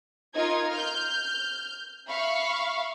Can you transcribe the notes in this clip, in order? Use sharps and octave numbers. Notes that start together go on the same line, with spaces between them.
D#4 F4 A#4 G#6
F6 G6
E5 F5 B5 C#6